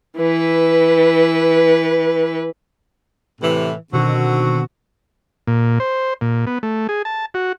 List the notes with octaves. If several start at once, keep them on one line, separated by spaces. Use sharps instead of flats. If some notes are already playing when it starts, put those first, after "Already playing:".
E3 B4
A2 C3 E3
B2 D3 D#3 C4 F#4
A#2
C5
A#2
B3
A3
G#4
A5
F#4